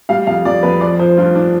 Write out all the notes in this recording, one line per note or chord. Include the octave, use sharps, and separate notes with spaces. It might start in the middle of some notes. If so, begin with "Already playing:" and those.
G3 F5
F2 F5
F2 D5
F2 B4
F3 D5
F3 C5
G2 F4
G2 D4